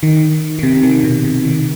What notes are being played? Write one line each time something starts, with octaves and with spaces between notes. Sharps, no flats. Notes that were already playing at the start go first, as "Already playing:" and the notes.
D#3
D#3
C3
D#3
B2
C3
D#3